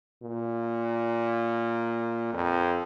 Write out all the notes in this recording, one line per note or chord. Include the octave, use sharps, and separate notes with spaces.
A#2
F2